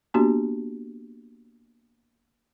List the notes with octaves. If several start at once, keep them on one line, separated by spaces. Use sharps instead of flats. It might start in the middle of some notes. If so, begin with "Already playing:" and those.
A#3 B3 D4 F#4 G4